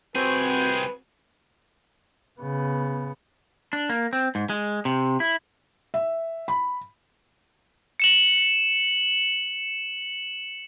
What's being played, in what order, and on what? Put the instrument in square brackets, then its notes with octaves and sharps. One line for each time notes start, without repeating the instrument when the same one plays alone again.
[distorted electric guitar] C2 G#4 [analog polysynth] C4 F#4 G#6 [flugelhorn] B4 [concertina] C5 G5
[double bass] C#3 B3
[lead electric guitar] D4
A#3
C4
G#2
G#3
C3
E4
[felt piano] E5
B5
[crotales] C#7 E7 F#7